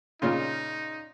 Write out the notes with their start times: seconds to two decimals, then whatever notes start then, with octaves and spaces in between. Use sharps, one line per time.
0.22 A#2 C#3 D#4 F4